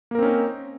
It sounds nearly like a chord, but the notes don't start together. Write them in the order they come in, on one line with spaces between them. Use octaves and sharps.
A#3 A#4 C4 C#4 D#4